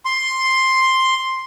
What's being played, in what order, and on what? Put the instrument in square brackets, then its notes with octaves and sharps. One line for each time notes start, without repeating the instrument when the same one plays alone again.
[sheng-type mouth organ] C6